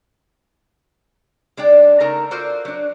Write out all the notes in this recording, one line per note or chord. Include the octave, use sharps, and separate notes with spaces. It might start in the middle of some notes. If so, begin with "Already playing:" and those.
G#3 D4 D5 G5
C#3 A3 D#4 A#4 A5 A#5
F4 F#4 A4 A#4 C5 D5
F#3 D4